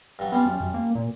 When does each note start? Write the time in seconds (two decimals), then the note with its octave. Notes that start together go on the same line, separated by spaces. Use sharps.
0.19 G2 F#3
0.32 G3 B3 C#4 F4
0.45 F#2
0.60 F#2
0.74 A#3
0.95 A#2